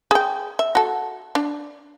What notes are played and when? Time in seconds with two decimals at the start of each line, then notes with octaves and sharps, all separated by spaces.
0.11 G#4 G5
0.59 E5
0.75 F#4 A4
1.35 D4